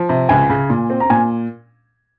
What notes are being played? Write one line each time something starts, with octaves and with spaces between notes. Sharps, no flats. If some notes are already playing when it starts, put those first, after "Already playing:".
Already playing: F3
C3
C#2 G#5
C#3
A#2
C4
A#5
A#2 G#5